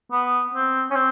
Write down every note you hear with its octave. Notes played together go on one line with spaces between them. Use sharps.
B3
C4
C#4
C4